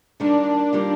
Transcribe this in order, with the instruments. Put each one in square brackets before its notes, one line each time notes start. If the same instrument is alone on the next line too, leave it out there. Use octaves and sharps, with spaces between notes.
[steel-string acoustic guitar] D#3 G3 A#3 F4 [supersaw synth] D4
[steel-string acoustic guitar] D#3 G3 A#3 F4